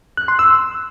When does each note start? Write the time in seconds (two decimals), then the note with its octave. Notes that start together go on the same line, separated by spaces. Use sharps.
0.17 F#6
0.28 C6
0.39 E6